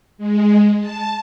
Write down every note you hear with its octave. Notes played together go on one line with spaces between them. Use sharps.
G#3
A5